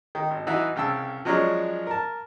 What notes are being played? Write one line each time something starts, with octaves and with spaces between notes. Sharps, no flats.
D#3
G#1
E3 D#4 F#4 E5
C2 C#3 G5 A5 E6
F3 F#3 G#3 C#4 D4
A#4 A5